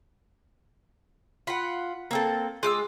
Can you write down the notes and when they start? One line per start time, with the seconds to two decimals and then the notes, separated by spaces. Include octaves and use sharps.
1.47 F4 F#5 B5
2.11 A#3 C4 A4
2.63 G#3 F4 D6 E6